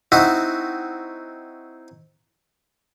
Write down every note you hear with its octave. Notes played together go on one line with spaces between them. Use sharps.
C4 D#4 E4 F#4